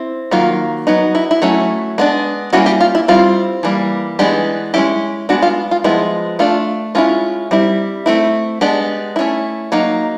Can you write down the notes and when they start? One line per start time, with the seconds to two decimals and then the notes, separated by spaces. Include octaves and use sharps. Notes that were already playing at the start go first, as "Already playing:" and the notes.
Already playing: C4 E4
0.31 D#3 F#3 A#3 F4
0.87 F#3 B3 D#4
1.15 E4
1.31 E4
1.42 F#3 A3 C#4 E4
1.98 G#3 B3 D4
2.53 G3 A#3 C#4 E4 F#4
2.66 G4
2.81 F4
2.95 E4
3.08 G3 C4 E4 F4
3.63 E3 G3 A#3
4.19 E3 G#3 B3 D4 G4
4.74 G#3 C#4 E4 G4
5.29 G#3 B3 D4 F#4
5.42 F4
5.71 F4
5.84 F3 G#3 B3 E4
6.39 A3 D4 F4
6.95 G#3 C#4 E4 F4
7.51 G3 C4 E4
8.06 A3 C4 E4
8.61 G#3 B3 D4 G4
9.16 A3 C#4 E4
9.72 F#3 A#3 D#4